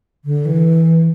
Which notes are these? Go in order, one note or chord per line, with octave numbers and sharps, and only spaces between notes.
D3
E3